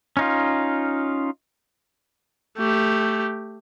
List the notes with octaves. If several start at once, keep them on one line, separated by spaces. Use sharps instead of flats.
C#4 D#4 F4
A3 G4